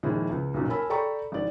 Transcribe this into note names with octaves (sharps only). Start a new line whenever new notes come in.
F2 A#2 D#3 G#3 E4
C#2
B1 F#2 A#2
A#4 C#5 G#5 A5 B5 E6
A4 D5 G5 A#5 B5 C#6
G#1 E3 D5